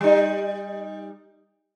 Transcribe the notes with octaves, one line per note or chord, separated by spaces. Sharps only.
G3 D#4